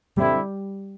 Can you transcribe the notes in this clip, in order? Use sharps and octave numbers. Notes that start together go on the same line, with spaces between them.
D3 G3 C4 E4